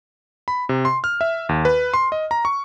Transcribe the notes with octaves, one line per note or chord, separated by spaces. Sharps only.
B5
C3
C6
F6
E5
D#2
B4
C6
D#5
A#5
C#6